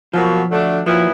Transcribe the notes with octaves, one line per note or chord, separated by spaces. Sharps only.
B2 F3 F#3 A#3 F4
D3 F#3 A3 D4
A#2 F3 F#3 B3 E4 F4